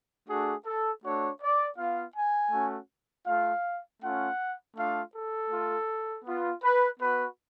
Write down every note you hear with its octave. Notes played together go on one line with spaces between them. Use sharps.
A3 D4 F#4 G#4
A4
A3 D4 F#4 C#5
D5
B3 F4 F5
G#5
A3 C#4 F#4
A3 F4 F5
A3 C#4 F4 F#5
A3 D4 F4 F5
A4
A3 F4
B3 F4
B4
B3 F#4 B4